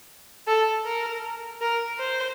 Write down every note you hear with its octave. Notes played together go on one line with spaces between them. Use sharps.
A4
A#4
A#4
C5